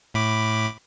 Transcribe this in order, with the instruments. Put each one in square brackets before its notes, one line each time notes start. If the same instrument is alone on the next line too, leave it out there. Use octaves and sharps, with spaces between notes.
[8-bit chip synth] A2 B5 D6